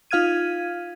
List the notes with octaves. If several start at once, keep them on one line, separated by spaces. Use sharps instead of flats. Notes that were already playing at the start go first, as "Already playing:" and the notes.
D#4 F4 F5 F6 G#6 D#7